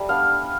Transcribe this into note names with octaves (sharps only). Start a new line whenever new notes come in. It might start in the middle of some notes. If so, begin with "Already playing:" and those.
Already playing: G3 A3
B3 D4 F5